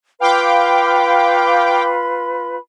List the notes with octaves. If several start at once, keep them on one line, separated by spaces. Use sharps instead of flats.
F4 B4 F5 G5 B5 D6